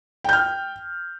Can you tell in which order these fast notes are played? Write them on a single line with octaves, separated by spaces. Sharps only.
G5 G6 F6